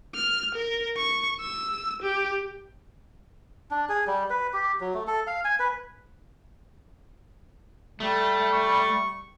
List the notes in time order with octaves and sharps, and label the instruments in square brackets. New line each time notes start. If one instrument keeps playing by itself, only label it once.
[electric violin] F6
A#4
C#6
E6
G4
[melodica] D4
G#4
G3
B4
G4
F#3
A3
A4
F5
G#5
B4
[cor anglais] G3 [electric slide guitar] A3
[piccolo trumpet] C#6